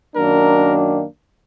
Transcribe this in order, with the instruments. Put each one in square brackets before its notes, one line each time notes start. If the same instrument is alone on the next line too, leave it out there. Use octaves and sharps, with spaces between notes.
[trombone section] F#2 D#3 F#3 A#3 D4 [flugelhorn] A#4